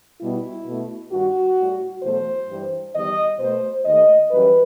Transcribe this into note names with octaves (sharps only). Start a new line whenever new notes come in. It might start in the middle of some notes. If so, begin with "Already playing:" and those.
B2 G3 E4
B2 A3
G2 D#3 G3 F#4
A2 G3
E2 B2 F#3 A3 C5
G2 E3 G3
E2 D#3 G3 D#5
B2 A3 C5
D#2 D#3 A3 D#5
F#2 E3 G3 B4